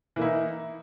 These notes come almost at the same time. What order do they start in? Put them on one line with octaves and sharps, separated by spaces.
E3 A#3 E4 D#4